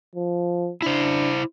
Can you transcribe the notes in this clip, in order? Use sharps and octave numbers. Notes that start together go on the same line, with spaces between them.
F3
D4 E4 C5